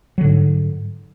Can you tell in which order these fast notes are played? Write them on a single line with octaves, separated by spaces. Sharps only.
F#3 D3 G#2